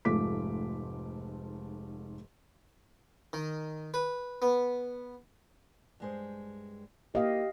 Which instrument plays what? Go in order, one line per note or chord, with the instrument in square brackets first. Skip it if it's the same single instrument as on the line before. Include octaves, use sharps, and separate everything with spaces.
[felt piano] F1 G#2 A3 F4 D6 B6
[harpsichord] D#3
B4
B3
[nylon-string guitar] G2 G#3 C5
[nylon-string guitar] A#3 E4 [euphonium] G4 [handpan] D#5 F5